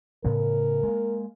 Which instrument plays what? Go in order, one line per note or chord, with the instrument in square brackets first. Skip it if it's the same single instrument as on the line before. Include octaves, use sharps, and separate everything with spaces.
[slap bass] A2 C#3 B3 [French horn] A#4
[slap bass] G#3 A#3